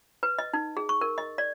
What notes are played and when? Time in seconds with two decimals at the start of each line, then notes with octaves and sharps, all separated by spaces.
0.23 B4
0.39 D#5
0.53 D#4
0.77 G#4
0.89 C#6
1.01 A#4
1.18 D#5
1.38 D5